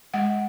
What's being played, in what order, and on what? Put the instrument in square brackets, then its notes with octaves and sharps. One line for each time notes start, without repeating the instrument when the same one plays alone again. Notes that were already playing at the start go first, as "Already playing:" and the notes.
[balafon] G#3 F#5